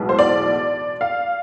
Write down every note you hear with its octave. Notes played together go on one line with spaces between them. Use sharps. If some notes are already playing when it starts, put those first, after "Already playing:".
Already playing: B1 A2 E3 G#3 B3
C5
D5
F5